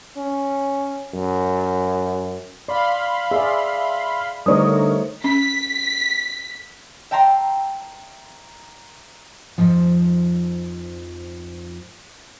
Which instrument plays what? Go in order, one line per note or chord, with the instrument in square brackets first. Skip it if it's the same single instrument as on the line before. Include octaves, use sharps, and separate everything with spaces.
[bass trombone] C#4
F#2
[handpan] D5 [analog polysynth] F5 B5 C6
[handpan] G#4 D5 [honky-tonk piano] E5
[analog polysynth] D3 A#4 [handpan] G3 A3 D#4 [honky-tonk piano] C5 C#5 D#6
[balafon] C#4 [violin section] B6
[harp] E5 G5 A5 A#5 C6
[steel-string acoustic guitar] F2 G#2 F3